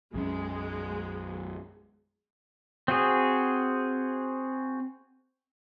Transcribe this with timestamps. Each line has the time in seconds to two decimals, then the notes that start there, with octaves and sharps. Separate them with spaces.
0.14 B1 F#2 G#3 C#4
2.88 C4 F#4 G#4